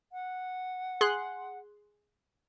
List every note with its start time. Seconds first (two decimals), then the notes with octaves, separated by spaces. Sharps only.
0.12 F#5
1.01 G#4 C6 F#6